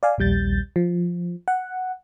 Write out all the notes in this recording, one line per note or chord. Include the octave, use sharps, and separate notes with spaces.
D5 F5 G#5
A#1 D#2 G3 G6 A6
F3
F#5